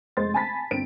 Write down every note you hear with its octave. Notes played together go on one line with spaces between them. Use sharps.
F1 G#3 C5 C6 A6
G#5 A5 B5 A6 B6
G1 C4 D7